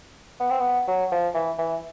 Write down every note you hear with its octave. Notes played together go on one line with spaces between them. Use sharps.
B3
C4
B3
F#3
F3
E3
E3